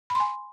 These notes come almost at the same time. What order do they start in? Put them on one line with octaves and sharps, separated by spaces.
B5 C6 G#5